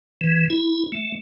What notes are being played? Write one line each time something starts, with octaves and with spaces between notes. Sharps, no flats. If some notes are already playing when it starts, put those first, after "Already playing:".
E3
E4
A3